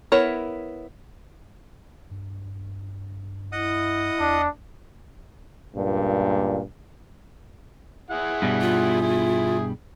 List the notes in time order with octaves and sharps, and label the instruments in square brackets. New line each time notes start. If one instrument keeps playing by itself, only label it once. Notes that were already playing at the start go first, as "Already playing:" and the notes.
[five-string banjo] B3 E4 A#4 C#5
[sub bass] G2
[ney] E4 [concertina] D#5 F#5 D#6
[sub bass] E2 [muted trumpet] D4
[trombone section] C#2 G2 A#2
[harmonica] E4 G#4 F#5
[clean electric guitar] G2 B2 G3
[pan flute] F4
[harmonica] E4 G#4